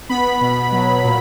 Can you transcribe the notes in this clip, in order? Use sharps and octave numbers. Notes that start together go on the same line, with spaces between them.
B3 B5
B2
F#3
A#2